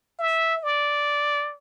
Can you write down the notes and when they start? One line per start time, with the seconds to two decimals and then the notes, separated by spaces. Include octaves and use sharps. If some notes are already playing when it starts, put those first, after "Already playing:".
0.19 E5
0.63 D5